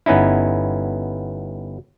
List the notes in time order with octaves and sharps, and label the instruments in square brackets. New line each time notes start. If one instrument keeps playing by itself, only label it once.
[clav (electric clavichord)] G1 B3 C#4 D#4 E4